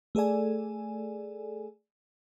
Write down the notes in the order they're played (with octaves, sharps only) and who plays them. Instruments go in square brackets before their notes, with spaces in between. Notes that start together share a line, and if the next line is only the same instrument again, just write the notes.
[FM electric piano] A3 G#4 A4 D5 G#5